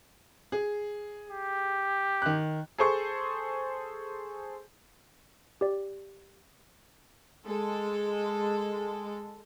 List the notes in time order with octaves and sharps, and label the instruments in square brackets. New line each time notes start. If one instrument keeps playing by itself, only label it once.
[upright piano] G#4
[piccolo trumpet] G4
[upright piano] D#3 F#6
G#4 A4 C5 C#6
[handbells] G4 D5
[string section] G#3 A4